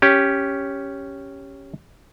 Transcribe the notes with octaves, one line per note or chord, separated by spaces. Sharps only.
C#4 G4